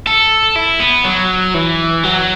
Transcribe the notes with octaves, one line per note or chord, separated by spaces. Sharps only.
A4
E4
B3
F#3
E3
F#3